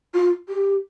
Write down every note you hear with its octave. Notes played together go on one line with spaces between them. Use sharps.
F4
G4